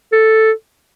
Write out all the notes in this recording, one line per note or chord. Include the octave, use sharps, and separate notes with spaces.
A4